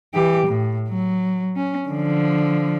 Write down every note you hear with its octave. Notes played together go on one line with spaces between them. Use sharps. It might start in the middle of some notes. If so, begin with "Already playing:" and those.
E3 G4
A2
F#3
C#4
D3 F3